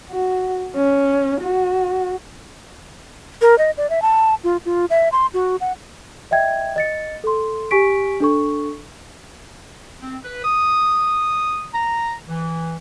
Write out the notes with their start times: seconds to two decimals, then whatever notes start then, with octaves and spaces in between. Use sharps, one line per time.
0.10 F#4
0.76 C#4
1.41 F#4
3.42 A#4
3.58 D#5
3.78 D5
3.90 E5
4.02 A5
4.44 F4
4.66 F4
4.90 E5
5.12 C6
5.34 F#4
5.61 F#5
6.31 D#5 E5 G5 G#6
6.76 D#5 A6 C#7
7.24 A4 C6
7.71 G4 G#5 C#6 B6 D7
8.20 D4 A4 C#6
10.01 C4
10.25 B4
10.45 D#6
11.73 A#5
12.29 E3